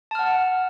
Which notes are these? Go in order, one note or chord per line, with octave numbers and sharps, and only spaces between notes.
F#5 A5 F6